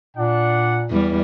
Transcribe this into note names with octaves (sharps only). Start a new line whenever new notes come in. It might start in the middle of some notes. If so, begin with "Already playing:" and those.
A#2 D4 F#5
E2 G3